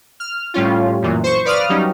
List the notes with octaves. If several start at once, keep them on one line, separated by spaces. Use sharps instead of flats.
F6
A2 G3 C#4 F4
F#2 A#2 E3
C5 C#6
B4 D5 F5 D#6 F6
F#3 G3 C#4 D#4